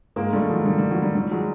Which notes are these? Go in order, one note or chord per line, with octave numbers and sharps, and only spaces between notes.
G#2 G#3 A#3
G3 A3
D#3
F#3 G#3
D#3 G3
G3
D#3 F#3
G3
D#3 G3
F#3 G#3